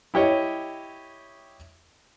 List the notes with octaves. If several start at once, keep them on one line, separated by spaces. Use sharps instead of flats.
E4 G4 C#5 D#5